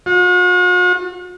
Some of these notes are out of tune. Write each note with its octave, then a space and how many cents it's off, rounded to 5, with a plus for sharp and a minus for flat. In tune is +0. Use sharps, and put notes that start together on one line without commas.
F#4 -45